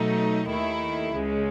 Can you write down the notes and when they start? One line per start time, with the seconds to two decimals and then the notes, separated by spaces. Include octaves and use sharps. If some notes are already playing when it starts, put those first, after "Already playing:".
Already playing: B2 F#3 A3 D#4
0.46 D#2 D#3 A3 E4
1.13 C#2 C#3 G#3